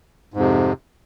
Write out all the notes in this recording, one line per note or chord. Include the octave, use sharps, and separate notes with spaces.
F2 G#2 C3